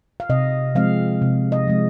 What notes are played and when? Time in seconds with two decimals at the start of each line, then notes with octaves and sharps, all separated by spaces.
0.20 F5
0.29 C3 D#5
0.75 F3 G#3 C4 F5
1.22 C3
1.52 D#5
1.68 F3 G#3 C4